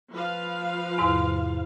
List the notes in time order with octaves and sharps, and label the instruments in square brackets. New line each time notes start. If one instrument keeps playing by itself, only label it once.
[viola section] F3 B4 F5
[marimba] E2 G#2 C3